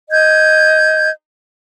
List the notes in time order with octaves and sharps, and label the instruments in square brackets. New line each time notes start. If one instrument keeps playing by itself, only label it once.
[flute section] D#5 G6 G#6